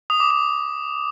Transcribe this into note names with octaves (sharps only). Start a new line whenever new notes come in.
D#6
D6
D#6